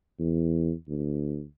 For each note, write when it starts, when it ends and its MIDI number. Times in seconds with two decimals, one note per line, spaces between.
0.19 0.73 40
0.88 1.44 38